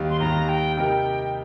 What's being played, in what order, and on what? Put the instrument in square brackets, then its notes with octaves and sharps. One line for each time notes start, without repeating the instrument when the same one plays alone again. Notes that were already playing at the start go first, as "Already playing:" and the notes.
Already playing: [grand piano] D#2 D#3 G3
[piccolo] C6
[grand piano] D#2 D#3 G3 [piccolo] A#5
[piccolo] G5
[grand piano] C3 G3 D#4 G4 A#4 [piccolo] G5